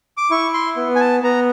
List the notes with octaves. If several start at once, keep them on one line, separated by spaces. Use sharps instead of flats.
D6
E4 C#6
C6
B3
G#5
A5
B3 A#5